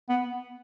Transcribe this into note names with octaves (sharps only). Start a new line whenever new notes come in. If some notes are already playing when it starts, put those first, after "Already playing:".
B3